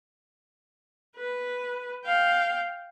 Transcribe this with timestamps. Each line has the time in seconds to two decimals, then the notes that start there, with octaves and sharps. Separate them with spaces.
1.16 B4
2.05 F5 G5